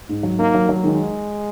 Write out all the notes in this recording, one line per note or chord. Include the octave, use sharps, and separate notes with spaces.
G#2
F#3
A#3 D#4
F#3
F#3
D#3 G#3